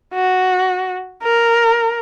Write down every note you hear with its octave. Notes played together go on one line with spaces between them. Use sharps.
F#4
A#4